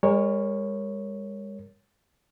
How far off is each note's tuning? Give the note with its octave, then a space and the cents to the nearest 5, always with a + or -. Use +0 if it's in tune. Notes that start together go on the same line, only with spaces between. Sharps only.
G#3 -45 A#4 +0 C#5 +0